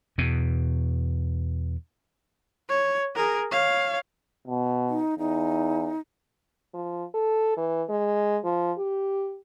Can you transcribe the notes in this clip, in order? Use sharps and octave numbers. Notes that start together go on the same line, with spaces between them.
E2 B2
C#5
G#4 A#4
C#5 F5
B2
D#4
E2 D#4
F3
A4
E3
G#3
F3
G4